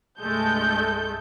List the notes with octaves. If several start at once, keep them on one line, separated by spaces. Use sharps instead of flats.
C2 G2 G#3 A3 A4 G6